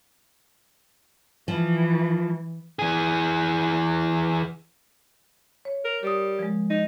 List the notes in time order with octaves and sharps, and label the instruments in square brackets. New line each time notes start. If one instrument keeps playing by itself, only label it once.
[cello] E3 [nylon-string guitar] F3
[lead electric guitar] E3 G#4
[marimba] C#5
[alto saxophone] A#4
[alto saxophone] G3 [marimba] A#4 D#6
[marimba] F3 G#3
[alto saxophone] D#4 [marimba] D#5